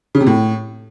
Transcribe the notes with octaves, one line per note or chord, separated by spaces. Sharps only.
C#3
C3
A2